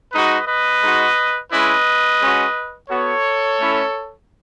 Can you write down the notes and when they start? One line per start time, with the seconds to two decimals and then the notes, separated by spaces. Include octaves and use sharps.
0.13 G#3 D#4 F#4 B4 D#5
0.47 B4 D#5
0.82 G#3 D#4 F#4
1.51 G#3 C#4 E4 B4 D#5
2.20 G#3 C#4 F#4
2.89 B3 F#4 A4 C#5
3.58 A3 C#4 E4